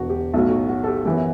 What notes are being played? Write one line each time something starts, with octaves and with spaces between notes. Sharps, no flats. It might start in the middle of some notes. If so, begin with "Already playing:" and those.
Already playing: E1 D3 F#4
G4
B1 A2 F#3 A4
F#4
F#4
A4
G4
F#2 E3 B3 G4